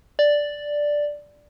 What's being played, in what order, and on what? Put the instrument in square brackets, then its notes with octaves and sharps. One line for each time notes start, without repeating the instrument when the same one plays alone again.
[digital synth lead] D5